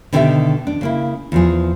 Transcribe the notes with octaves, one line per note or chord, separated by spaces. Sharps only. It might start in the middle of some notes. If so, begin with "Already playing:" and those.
B2 D3 D#3 G4 C5 E5
D4
C#3 A#3 E4
E2 F3 G#4